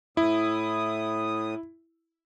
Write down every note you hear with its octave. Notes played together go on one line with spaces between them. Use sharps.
A2 E4 D#6